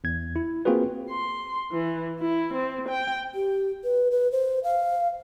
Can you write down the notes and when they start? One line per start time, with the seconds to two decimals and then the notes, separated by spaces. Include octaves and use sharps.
0.04 E2 G#6
0.36 E4
0.65 A#3 C4 F4 F#4 G#4 B4
1.11 C6
1.72 E3
2.19 E4
2.54 C4
2.89 G5
3.34 G4
3.84 B4
4.11 B4
4.32 C5
4.64 F5